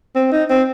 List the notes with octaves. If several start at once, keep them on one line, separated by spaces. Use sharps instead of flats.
C4
D#4
C4